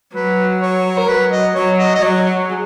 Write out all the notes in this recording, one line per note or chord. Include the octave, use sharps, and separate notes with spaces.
F#3 B4
C#5
A#4
F#3 B4
D#5
F#3 C#5
D#5
D#5
F#3 C#5
G#4